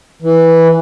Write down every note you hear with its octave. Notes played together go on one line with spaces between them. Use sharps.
E3